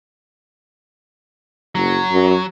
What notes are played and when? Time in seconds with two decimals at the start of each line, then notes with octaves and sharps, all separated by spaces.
1.75 F#1 F#3
2.13 F#2